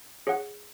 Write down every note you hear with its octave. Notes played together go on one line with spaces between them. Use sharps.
G#4 C#5 F#5